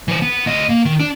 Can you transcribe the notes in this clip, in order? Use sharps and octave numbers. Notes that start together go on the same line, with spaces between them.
E3 C5
B3
D2 D#5
A#3
D#3
D4